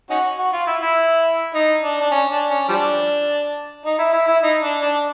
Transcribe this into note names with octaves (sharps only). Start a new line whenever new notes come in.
C#4 D#4 F#4
F#4
F4
E4
E4
D#4
D4
D4
C#4
D4
C#4
F3 G3 D4
D#4
E4
E4
E4
D#4
D4
D4